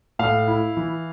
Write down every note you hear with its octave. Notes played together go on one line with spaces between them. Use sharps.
A2 F5
E4
E3